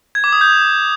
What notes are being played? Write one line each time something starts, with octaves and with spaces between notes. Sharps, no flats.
G#6
D6
D#6
G6